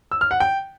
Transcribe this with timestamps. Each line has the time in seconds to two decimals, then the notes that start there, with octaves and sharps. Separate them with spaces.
0.11 E6
0.21 F6
0.31 F#5
0.40 G5